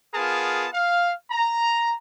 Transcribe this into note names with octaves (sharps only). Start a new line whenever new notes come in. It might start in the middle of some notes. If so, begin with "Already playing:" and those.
B3 F4 G#4 A#4 A5
F5
A#5